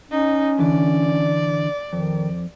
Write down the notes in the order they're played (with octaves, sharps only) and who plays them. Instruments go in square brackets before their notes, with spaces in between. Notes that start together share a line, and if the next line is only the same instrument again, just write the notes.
[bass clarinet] C#4 [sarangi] D#4
[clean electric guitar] D3 E3 [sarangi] D5
[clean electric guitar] F2 [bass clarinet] D#3